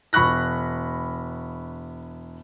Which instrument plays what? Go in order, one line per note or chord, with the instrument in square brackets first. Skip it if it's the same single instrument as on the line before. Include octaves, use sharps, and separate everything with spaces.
[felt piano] E1 B5 C#6 F#6 A#6